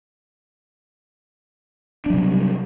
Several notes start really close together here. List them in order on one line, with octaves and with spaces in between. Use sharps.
D4 F#3 C3 G3